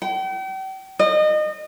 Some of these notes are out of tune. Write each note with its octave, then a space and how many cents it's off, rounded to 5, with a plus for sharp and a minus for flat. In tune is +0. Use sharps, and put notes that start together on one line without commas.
G5 -40
D#5 -30